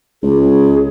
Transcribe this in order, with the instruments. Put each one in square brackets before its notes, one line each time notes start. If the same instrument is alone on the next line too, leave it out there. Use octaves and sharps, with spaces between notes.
[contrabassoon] C#2 [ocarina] G#4